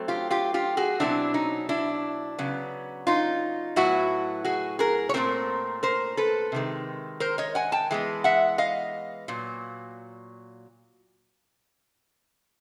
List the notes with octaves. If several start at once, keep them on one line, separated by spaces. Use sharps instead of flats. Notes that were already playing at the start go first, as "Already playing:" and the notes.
Already playing: F#3 A3 C4
F4 G4
F4 G4
F4 G4
F#4 G#4
B2 F#3 A3 C4 D4 E4
C#4 D#4
D4 E4
C#3 F#3 B3
D#4 F4
A2 F#3 B3 E4 F#4
F#4 G#4
G#4 A#4
C#5
A#2 F3 A3 C4 A#4 C5
A#4 C5
A4 B4
C3 D#3 G#3
A#4 C5
C#5 D#5
F#5 G#5
G5 A5
E3 G#3 B3
E5 F#5
D#5 F5
A#2 F#3